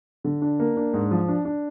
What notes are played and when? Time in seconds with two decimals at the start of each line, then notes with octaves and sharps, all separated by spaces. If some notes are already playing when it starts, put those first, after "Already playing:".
0.24 D3
0.42 D4
0.60 A#3
0.77 D4
0.94 G#2
1.11 F3
1.29 D4
1.45 D4